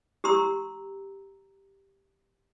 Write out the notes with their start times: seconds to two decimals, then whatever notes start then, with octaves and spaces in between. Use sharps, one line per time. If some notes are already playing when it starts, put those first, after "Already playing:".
0.24 G4 A#5 C6 E6